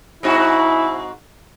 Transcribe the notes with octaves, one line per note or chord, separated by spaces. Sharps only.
G#2 C4 E4 F#4